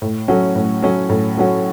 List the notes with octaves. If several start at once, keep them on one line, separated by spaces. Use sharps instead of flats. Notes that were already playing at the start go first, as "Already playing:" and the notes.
A2
F#3 A3 C#4 F#4
A2
F#3 A3 C#4 F#4
A2
F#3 A3 C#4 F#4